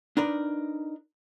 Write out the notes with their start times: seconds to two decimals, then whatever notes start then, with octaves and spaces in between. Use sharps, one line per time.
0.17 D4 D#4 A#4 B4 D5